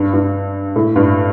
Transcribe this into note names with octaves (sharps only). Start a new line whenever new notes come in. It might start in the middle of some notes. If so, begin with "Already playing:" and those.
Already playing: G2
G2
A2
G2